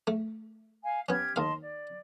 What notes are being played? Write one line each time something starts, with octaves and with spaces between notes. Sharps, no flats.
A3
F5 G#5
B3 C#4 G4 F6 G#6
D#2 D#5 F5 A5 C6
D5